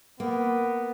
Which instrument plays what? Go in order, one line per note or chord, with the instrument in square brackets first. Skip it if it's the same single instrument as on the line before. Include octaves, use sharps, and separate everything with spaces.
[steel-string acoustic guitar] A#3 [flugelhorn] B3